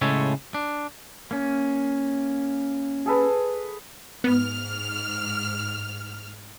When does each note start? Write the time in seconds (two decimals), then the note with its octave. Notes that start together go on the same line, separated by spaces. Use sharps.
0.01 A2 C#3 G#3 A4 C#5
0.54 D4
1.31 A#3 C#4
3.06 G#4 A4 B4
4.24 G#2 B3 F6